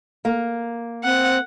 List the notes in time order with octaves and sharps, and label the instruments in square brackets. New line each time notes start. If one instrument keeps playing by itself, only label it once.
[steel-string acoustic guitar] A#3
[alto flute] C4 [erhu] F#5